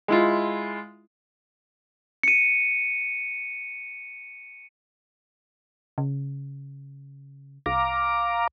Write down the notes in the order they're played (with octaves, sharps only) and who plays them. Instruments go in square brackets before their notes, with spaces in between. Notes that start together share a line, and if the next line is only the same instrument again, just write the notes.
[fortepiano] G#3 E4 F4
[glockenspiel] C#7 D#7
[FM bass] C#3
[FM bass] C2 [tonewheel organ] F5 A#5 D6